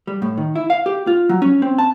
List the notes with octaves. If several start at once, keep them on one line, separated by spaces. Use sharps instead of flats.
G3
A2
D#3
E4
F5
G4
F4
F#3
C#4
C4
A5